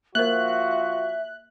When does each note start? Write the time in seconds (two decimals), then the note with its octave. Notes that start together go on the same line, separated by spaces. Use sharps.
0.15 F3 A#3 F#4 A#4 C5 E5 F#6